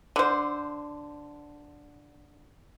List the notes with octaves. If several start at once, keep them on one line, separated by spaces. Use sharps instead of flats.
D3 C5